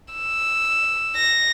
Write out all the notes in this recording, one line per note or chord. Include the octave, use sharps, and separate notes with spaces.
E6
A#6